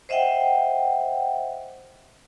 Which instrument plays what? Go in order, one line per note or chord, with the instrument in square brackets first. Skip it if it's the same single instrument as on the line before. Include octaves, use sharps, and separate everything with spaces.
[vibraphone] C5 D#5 E5 F#5 G5